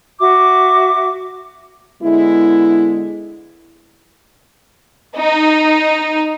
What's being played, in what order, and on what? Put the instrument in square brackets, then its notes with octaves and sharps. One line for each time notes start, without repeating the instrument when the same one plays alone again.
[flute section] F#4 E5 D6
[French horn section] D3 G#3 B3 E4
[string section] D#4